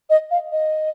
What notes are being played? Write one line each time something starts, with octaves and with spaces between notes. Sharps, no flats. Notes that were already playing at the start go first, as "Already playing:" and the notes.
D#5
F5
D#5